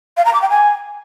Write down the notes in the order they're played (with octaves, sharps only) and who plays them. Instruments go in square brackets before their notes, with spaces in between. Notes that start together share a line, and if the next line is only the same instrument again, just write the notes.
[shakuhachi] F5
A#5
D6
G5
G#5